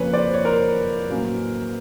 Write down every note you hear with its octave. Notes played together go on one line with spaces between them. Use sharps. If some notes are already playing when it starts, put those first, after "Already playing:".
Already playing: F2 C#3 F3 A#3 C#4 B4 C#5
C5 D5
C#5
A#4 C5
A2 F#3 A#3 C#4